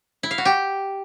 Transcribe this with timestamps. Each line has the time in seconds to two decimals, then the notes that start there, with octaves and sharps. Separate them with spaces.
0.23 E4
0.31 F5
0.38 F#4
0.45 G4